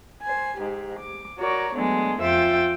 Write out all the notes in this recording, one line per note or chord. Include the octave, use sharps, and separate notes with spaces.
C5 G#5
G#2 G4
D6
F#4 A#4 C#5 D5
F#3 G#3 A3 B3 D4
F2 F4 C5 E5 G5 A6